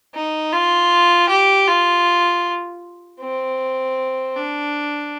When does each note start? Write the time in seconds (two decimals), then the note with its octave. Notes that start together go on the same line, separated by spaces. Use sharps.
0.14 D#4
0.52 F4
1.29 G4
1.67 F4
3.20 C4
4.36 D4